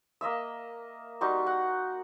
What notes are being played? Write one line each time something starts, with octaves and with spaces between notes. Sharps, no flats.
A#3 D#5 E5 E6
G3 D#4 F#4 C6
F#5